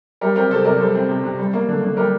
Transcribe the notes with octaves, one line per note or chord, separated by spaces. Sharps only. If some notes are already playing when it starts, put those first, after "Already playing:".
G3 G4 A#4
C4 G4 A#4
C3 A4 C5
C3 A#4 D5
G3 A4 C5
C4
C3
C3
G3
A#3
D3
D3
G3 G4 A#4